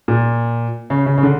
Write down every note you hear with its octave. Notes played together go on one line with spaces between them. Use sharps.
A#2
C#3
C#3
C#3
D3